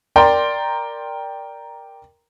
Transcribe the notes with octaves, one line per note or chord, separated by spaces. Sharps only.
A#4 D5 G5 A#5 C6